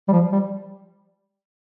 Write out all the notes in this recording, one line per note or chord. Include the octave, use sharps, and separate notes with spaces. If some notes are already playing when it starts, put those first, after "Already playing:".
G3
F3
G3